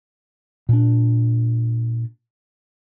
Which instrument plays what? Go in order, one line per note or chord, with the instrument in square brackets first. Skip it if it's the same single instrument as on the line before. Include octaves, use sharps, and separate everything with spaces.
[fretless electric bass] A#2 D4